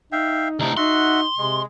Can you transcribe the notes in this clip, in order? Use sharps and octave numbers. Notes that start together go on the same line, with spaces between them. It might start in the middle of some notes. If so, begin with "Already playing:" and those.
D#4 E5 F5 G5
D2 A2 C3 D#4
D#4 F#4 E5 F#5 C6
C3 G#3